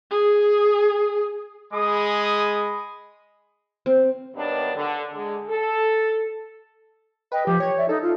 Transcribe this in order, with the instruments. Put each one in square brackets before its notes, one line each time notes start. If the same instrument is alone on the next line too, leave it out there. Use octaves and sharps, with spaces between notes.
[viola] G#4
[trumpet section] G#3 G#4 B5 D#6
[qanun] C4
[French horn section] G2 D#3 F#3 B3 D4
D3
D3 G#3
A4
[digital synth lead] B4 [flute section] D#5 G5
[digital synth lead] F3 [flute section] G4
[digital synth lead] C#5 [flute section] G#6
[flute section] D5 E5
[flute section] D#4 D#5 [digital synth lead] A4
[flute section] F4